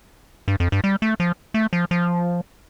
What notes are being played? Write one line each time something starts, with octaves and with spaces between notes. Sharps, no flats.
G2
F2
G2
G3
A3
F3
A3
F3
F3